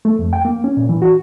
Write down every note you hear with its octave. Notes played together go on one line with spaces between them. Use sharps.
A3
F2
G5
A#3
C#4
A#2
E3
F#4